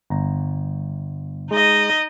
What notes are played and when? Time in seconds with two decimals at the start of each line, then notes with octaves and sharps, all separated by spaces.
0.10 G1 A#5
1.51 G#3 D#4 D#5